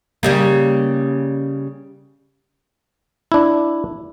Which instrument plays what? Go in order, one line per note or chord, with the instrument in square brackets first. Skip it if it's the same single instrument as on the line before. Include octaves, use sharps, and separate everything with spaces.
[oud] C#3 G3 A#3
[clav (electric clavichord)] D4 E4